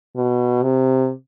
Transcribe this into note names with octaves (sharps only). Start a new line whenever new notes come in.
B2
C3